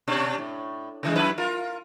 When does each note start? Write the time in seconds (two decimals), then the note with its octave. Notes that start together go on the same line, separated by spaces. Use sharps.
0.08 B2 C#4 D4
0.38 A2
1.03 C#3 E3 G#3
1.16 F#2 E4 B4
1.38 F4 A#4